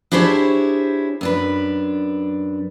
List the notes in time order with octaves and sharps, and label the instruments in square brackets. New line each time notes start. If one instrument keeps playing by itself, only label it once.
[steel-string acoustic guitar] D4 E4 G4 G#4 C5 C#5
F#2 D4 B4